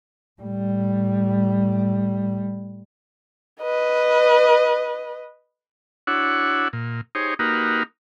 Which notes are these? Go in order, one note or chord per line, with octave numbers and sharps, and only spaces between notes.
A2 G3
B4 D#5
D4 E4 F#4 C#5 F#5
A#2
D#4 G4 G#4 C5 C#5
A#3 D#4 F#4 G4 A#4 B4